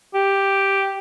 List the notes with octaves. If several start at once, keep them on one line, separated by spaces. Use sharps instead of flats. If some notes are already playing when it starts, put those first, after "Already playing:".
G4